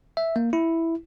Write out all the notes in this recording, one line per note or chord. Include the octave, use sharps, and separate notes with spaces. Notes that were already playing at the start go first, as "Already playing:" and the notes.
E5
A#3
E4